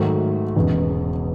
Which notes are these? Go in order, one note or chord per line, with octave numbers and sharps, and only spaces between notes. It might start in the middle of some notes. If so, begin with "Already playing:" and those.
Already playing: G#2 D#3 F#3 A3
E1 E2 C#3